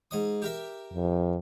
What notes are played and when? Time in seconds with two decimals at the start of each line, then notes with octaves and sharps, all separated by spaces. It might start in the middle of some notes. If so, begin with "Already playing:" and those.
0.11 G#2 D#5 D#6
0.42 G4 A#4 E5
0.94 F2